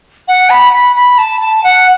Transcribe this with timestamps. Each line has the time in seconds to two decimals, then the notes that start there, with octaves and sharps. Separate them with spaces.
0.28 F#5
0.50 B5
0.73 B5
0.96 B5
1.18 A5
1.41 A5
1.64 F#5